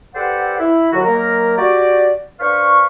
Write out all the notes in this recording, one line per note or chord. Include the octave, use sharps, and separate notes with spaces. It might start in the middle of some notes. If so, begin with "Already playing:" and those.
G4 A4 B4 C5 D5 F#5
E4
D#2 D3 F#3 F#4
D#3 F#3 A#3 A#4
F#4 G4 D5
D4 B4 C5 F5 C#6